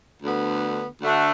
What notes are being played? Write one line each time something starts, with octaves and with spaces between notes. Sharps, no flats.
D2 D3 B3
D2 D3 A3 D4 F#4